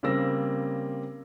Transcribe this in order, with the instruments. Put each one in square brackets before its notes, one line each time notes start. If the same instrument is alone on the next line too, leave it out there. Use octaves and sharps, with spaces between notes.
[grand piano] C#3 G3 A#3 C4 E6 A#6